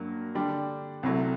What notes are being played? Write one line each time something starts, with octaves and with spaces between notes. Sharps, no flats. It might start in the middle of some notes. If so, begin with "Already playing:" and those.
Already playing: G2 F#3 A#3
D3 G3 D4
C2 C3 F#3 A3